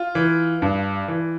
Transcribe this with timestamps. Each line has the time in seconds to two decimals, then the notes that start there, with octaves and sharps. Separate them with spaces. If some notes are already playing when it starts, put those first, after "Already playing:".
Already playing: F4
0.15 E3
0.62 G2
1.08 E3